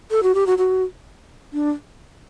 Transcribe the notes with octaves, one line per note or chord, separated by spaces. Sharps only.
A4
F#4
G4
F#4
F#4
D4